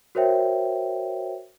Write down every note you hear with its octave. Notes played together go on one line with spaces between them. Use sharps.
F#4 A#4 C5 C#5 E5 G5